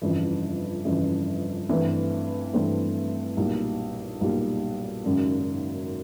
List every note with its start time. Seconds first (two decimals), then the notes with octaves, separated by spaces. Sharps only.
0.02 G1 F2 C#3 E3
0.85 G1 F2 C#3 E3
1.69 G2 E3 A3 C4 E4
2.53 G2 E3 A3 C4 E4
3.37 B1 A#2 G3
4.21 B1 A#2 G3
5.05 G#1 F#2 C#3